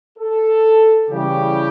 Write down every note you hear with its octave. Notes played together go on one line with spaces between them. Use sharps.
A4
C#3 E3 G3 G4